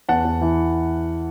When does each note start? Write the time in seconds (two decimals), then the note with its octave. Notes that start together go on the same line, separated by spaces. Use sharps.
0.09 E2 F#5 A5
0.25 E2
0.41 E3